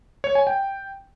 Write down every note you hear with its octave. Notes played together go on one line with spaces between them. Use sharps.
C#5
G#5
G5